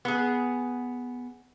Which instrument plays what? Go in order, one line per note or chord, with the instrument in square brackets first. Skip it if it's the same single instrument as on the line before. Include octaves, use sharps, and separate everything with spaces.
[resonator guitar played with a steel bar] B3 G#4